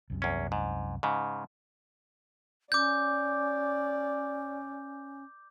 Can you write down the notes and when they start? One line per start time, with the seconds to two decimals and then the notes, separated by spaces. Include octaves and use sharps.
0.10 C2 F#2 C3
0.22 E2 C#4
0.52 G#2
1.03 G#2 C#3
2.72 C#4 D5 D6 G6